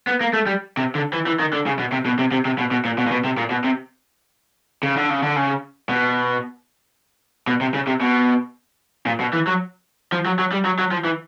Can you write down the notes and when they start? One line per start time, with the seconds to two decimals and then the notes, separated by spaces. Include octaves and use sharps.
0.07 B3
0.21 A#3
0.33 A3
0.47 G3
0.77 C3
0.95 D3
1.13 E3
1.26 E3
1.39 D#3
1.53 D3
1.66 C#3
1.79 B2
1.92 C3
2.06 B2
2.19 C3
2.32 C3
2.45 C3
2.59 B2
2.71 B2
2.85 A#2
2.98 B2
3.07 A#2
3.12 B2
3.24 C3
3.38 A#2
3.51 B2
3.64 C3
4.83 C#3
4.97 D3
5.10 C#3
5.23 D3
5.36 C#3
5.89 B2
7.47 B2
7.61 C3
7.74 C#3
7.87 C3
8.01 B2
9.06 A#2
9.20 B2
9.33 E3
9.47 F#3
10.12 F3
10.25 F#3
10.39 F#3
10.52 G3
10.65 F#3
10.79 F#3
10.92 F3
11.05 E3